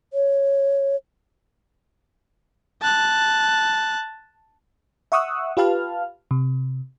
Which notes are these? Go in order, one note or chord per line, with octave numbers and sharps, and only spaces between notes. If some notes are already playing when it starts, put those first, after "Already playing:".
C#5
A5 F#6
E5 F#5 C#6 D#6 E6 F#6
F4 G4 B4 F5 A5 F6
C3